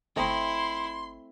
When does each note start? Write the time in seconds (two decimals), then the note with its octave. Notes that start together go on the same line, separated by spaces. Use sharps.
0.16 G1 A3 C4 E4 D#5 C6